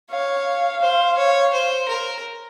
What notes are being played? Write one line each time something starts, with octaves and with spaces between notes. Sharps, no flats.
C#5 F5
C5
C#5
C5
A#4